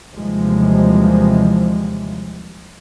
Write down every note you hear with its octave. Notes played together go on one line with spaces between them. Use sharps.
D#2 C3 E3 F3 G3 G#3